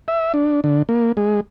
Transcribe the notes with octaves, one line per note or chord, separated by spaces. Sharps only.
E5
D4
D3
A#3
G#3